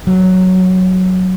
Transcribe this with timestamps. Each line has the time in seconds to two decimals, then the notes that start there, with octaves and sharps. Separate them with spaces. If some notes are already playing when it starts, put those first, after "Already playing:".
0.07 F#3